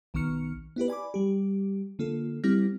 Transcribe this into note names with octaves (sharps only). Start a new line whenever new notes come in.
B1 D#3 B3 C#6 F6 C#7
B3 E4 G4 B4
D5 G#5 B5 D6
G3 G4
D3 A#3 F4 A4
G3 C4 E4 G4 F6 A#6